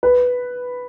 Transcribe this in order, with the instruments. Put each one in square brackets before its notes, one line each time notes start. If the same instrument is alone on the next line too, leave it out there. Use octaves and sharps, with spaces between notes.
[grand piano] B4